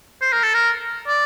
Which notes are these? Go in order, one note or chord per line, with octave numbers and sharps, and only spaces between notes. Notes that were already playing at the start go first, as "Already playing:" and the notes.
C5
A#4
A4
A#4
D5